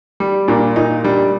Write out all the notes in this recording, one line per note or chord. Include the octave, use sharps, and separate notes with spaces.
G3
A#2 D4
A#2 D#4
G3 D4